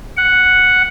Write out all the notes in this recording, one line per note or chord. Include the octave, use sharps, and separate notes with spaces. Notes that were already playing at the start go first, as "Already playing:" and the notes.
F#5